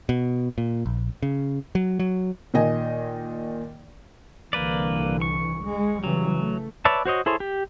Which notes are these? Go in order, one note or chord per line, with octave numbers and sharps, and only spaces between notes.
B2
A#2
A#1
C#3
F#3
F#3
A#2 D#3 D#5 G#5
C2 D3 E3 A#3 B4 D5
C#6
G#3
C#3 E3 F#3 G3
A3
B4 C#5 D5 E5 A5
F#4 C5 C#5 D#5
E4 G#4 A4 C5 C#5
G4